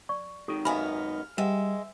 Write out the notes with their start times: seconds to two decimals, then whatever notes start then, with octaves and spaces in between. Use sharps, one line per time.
0.09 D5 C#6
0.48 G#2 D#3 G4 A4 D#6
0.65 F#2 B3 D#4 F5 G#5 B5 F6
1.38 G3 G#3 B4 E5 F#5